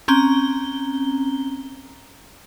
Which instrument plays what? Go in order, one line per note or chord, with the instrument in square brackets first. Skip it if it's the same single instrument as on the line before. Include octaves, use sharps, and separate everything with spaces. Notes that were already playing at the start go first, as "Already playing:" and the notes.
[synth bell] C4 C#4 A#5 G7